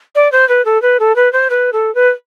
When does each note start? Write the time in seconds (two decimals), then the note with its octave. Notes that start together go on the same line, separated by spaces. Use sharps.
0.15 D5
0.32 C5
0.49 B4
0.65 A4
0.82 B4
1.00 A4
1.16 B4
1.33 C5
1.50 B4
1.73 A4
1.95 B4